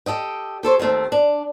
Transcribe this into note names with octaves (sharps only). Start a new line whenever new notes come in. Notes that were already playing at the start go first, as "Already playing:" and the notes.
G4 A4 D#5 G5
G4 A4 C5 C#5
D#2 D#3 A3 C4
D4